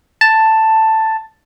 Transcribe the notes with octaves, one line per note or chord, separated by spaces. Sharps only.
A5